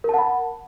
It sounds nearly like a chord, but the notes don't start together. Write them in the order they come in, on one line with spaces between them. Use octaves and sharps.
A#4 A5 F#5 B5